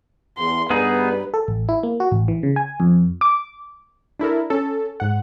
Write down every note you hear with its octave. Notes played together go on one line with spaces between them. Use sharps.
E2 C6
G2 G3 B3 D#4 G#4 B4
A4
A1
E4
A#3
F#4
A1
E3
C#3
G#5
F2
D6
D4 E4 A4 A#4
C#4 A4
G#2 F#5